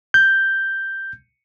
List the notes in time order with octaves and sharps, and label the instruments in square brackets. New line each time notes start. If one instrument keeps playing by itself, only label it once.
[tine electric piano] G6